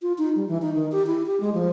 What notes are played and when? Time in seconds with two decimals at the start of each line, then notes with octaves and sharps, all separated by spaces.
0.02 F4
0.18 D#4
0.36 G3
0.48 E3
0.62 D#4
0.75 D#3
0.92 G4
1.07 E4
1.26 G4
1.40 G#3
1.54 F3